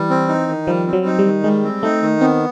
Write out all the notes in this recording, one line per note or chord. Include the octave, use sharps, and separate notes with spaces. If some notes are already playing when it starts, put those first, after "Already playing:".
Already playing: E3 G3
C4
D#4
D#3
F3 G3
C4
F#3
D#4
G3
D#3
G3 G#3
C4
A3 D#4
D#3
B3 C4